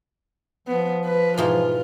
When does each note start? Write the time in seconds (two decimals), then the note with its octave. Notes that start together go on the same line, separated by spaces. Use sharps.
0.67 F3 B3
1.05 B4
1.38 G#2 B2 E3 F4